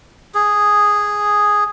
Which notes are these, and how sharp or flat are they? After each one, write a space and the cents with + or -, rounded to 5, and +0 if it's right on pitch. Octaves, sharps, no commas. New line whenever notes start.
G#4 -5